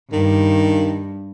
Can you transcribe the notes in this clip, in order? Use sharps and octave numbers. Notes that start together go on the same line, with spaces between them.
G2 D#3